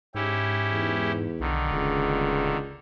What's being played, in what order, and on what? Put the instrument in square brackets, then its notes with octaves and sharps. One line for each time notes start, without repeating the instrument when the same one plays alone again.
[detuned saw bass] G#2 [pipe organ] C#4 E4 G4
[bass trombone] E2
[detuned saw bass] B1 [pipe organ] D3 D#3
[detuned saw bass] D#1 [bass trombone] C#2